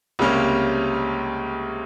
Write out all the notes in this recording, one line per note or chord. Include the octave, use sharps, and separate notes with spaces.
C#2 C3 G3 A#3 C#4